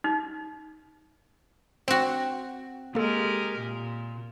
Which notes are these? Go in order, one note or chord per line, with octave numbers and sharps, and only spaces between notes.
D#4
C4 F#4 C5
G#3 A#3 G4 A4 A#4
A#2